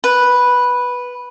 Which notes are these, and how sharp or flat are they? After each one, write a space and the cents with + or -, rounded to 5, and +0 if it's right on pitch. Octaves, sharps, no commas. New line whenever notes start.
B4 -5